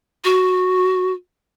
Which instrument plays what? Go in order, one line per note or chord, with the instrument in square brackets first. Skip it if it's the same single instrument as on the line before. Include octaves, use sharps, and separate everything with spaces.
[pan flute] F#4